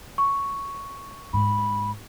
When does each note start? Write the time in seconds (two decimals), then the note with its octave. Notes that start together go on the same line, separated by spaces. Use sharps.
0.18 C#6
1.33 G#2 B5